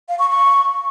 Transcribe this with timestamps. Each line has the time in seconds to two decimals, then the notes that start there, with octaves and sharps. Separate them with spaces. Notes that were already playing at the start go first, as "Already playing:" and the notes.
0.09 F5
0.19 C#6
0.29 C#6